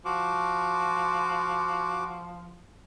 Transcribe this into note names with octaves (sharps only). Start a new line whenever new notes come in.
F3 F#4 D6